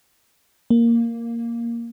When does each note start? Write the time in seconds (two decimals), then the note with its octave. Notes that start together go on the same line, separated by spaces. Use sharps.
0.70 A#3